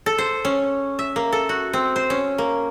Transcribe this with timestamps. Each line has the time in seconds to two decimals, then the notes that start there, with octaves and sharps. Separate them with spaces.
0.06 A4
0.18 C5
0.45 C#4
0.99 E5
1.16 A#3
1.33 A4
1.49 F#4
1.73 C4
1.96 C5
2.10 C#4
2.38 A#3